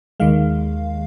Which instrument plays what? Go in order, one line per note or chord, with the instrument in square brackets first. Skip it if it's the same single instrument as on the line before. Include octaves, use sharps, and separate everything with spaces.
[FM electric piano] D#2 D#3 G#3 F5